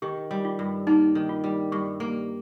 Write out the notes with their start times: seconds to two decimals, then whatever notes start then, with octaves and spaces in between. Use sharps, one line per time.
0.02 D#3 G4
0.31 G3
0.45 F4
0.59 G2
0.87 A#3 D#4
1.15 D#3
1.29 F4
1.44 G3
1.72 G2 G4
2.00 A#3